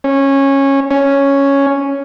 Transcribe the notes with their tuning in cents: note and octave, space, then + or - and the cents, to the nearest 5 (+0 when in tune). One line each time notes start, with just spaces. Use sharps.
C#4 -15
C#4 +0